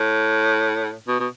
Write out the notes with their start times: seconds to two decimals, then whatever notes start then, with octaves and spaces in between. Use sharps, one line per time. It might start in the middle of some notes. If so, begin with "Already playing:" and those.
Already playing: A2
1.08 B2
1.20 B2